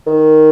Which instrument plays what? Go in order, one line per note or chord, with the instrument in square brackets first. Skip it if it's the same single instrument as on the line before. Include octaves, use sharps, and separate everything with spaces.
[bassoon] D#3